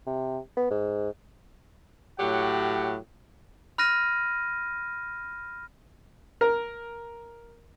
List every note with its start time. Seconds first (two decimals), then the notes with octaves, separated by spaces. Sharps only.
0.07 C3
0.57 B3
0.71 G#2
2.19 A2 F#3 G4 F#5
3.78 B5 F6 F#6 A#6 D#7
6.41 A#4